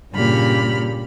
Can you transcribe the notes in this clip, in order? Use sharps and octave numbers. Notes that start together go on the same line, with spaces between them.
G2 A#2 C#3 G4 B5 F6